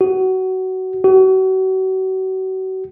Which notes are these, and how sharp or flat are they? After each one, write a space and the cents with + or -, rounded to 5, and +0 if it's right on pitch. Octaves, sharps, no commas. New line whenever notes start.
F#4 +20
F#4 +35